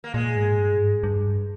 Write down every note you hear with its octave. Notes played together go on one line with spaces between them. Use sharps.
A#3
A#2 G#3
G#2
G2
G#2
G2